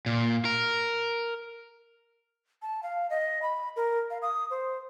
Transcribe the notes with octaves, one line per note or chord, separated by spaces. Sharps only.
A#2
A#4
A5
F5
D#5
B5
A#4
F5
D#6
C5